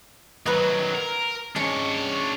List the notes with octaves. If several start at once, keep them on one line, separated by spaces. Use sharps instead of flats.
D#3 F#3 B4 D#5
A#4
G#3 C#4 D4 C#5